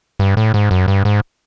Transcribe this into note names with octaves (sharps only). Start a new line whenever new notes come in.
G2
A2
G#2
F#2
G2
G#2